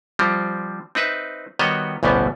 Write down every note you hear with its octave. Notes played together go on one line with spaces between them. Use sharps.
F3 G3 C4
C4 D#4 B4 E5
D#3 G3 B3 F#4 C#5 D#5
A1 D2 B2 G3 B3